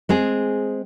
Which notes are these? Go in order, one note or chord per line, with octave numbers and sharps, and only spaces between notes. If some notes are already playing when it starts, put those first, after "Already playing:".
G#3 C4 G#4